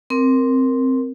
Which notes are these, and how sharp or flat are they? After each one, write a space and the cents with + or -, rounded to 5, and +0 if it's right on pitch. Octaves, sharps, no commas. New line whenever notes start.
C4 +0 A#4 +0